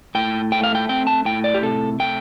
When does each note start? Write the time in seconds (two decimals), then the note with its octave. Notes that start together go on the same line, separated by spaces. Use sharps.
0.15 A2 G5
0.52 A3 G5
0.64 F5
0.75 G5
0.89 C4 G5
1.07 A5
1.25 A2 G5
1.44 D5
1.54 G4
1.63 C3 A4
2.00 A3 G5